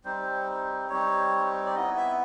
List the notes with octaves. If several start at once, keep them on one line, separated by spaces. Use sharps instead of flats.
G3 C4 D#4 C5
G3 C4 D#4 C#5
D5
B3 E4 D#5
E5